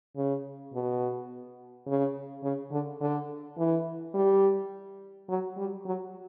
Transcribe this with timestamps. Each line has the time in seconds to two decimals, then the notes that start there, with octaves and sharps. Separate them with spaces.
0.16 C#3
0.74 B2
1.87 C#3
2.43 C#3
2.72 D3
3.01 D3
3.57 E3
4.14 G3
5.29 F#3
5.57 G3
5.85 F#3